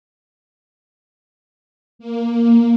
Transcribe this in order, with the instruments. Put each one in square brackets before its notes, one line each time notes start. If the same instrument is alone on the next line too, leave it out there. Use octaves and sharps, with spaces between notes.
[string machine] A#3